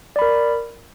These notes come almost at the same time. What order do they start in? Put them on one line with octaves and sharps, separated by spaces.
D5 B5 A#4